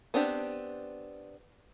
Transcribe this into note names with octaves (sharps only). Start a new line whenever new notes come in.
B3 C4 D4 G4